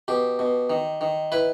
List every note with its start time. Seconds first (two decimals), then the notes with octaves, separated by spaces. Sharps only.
0.08 B2 G4
0.39 B2
0.70 D#3
1.01 D#3
1.32 E4 B4